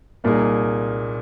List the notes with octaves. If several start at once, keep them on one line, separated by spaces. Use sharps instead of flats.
C2 A#2 A#3 D#4 G#4